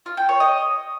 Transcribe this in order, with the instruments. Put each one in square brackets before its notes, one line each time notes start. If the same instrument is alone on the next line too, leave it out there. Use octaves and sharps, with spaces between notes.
[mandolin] F4
G5
C#5
D#5